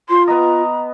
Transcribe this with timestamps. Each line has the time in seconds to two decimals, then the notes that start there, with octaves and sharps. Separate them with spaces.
0.09 F4 C6
0.27 B3 D#5 A#5